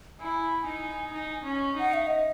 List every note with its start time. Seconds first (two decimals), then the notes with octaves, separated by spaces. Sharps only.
0.20 E4 G#5
0.66 D#4
1.13 D#4
1.45 C#4
1.76 D#4 F#5
1.94 E5
2.07 D#5